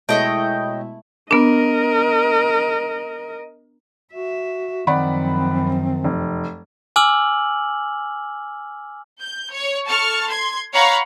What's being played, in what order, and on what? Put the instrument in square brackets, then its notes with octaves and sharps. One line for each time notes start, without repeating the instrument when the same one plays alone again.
[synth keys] B2 G#3 E4 [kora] A3 [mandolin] C#5 D#5 G5
[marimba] B3 D4 [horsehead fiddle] A#4 D#5
[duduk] F#4 [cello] E5
[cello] F#2 F3 [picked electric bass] D#3 [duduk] C4 [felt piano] D5 F#5 B5
[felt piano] F1
[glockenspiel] G#5 D6 E6 F6 F#7
[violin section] G6
C#5
A4 A5 C#6 F6
C6 G#6
C#5 F5 F#5 A#5 B5 C#6